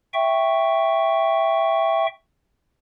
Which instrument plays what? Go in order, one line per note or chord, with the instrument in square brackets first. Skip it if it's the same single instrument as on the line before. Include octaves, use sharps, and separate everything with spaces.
[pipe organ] E5 G5 C#6